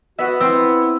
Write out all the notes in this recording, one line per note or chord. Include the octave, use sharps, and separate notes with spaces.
B3 F#4 E5
C4 E4 E6